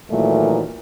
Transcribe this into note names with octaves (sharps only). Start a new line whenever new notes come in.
A#2 D#3 E3 F#3 A3